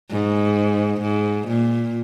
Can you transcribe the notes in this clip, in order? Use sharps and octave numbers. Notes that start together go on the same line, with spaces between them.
G#2
G#2
A#2